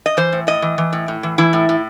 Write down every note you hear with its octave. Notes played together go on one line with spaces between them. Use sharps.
D#5
E3 C5
A2
A2 D#5
E3
E3
A2
A2
E3
E3 E4
A2
A2